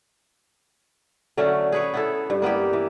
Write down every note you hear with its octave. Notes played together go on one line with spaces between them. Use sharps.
D3 F#3 A3 C#4
G#4 B4 C#5
B3 E4 A4
G2
A#3 B3 E4 G4
E3